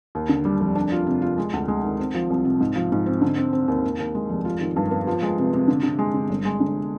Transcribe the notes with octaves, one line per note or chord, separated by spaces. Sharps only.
D#2
D3
G3
F1
D4
F4
C3
F4
G#3
D2
G#3
D#3
C4
F3
C2
C3
G#2
F3
G#2
C4
D3
C4
C4
D#2
D#2
D#2
G#3
F1
F4
D#3
G2
B3
F3
G#3
C3
C3
D3
D3
G#3
D3
G1
G#3
D3